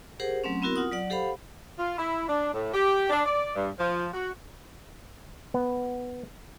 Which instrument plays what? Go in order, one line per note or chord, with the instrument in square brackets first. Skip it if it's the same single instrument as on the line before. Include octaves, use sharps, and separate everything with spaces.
[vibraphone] G4 G#4 A#4 C5 F#5
F#3 A3 C4 C#4
B3 C4 E4 F#4 A#4
F4 F#5 D#6
F#3 D5 F#5
G4 A4 C5 F5 F#5 B5
[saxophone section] F4
E4
D4
A2
G4
D4
D5
G2
F3
F#4
[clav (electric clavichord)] B3